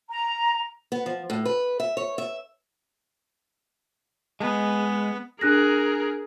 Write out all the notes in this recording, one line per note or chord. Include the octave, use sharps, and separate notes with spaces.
A#5
B3
F3
A2
B4
E5
C#5
E5
G#3 B3
D4 G#4 A#4 F#6 A#6